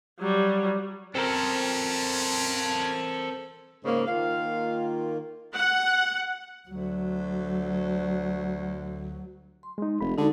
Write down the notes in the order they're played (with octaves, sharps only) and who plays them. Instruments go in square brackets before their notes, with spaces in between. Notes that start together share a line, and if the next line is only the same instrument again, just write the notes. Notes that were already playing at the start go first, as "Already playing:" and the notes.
[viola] F#3 G3
[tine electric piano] C4 A#4 [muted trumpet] C#4 [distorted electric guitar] A4 C5
[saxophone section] G#2 C#3 A#3 [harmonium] A#4
[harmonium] D#3 A#3 F4 [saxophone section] F5
[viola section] F#5
[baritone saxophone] D2 [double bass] F#3
[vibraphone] C6
[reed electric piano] G#3 D#4
[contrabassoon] F1 [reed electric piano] B5
[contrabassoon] D3 [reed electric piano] G#3 [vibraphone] D#4 F#4 A4